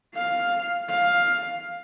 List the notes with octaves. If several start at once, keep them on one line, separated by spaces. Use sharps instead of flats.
F5
F5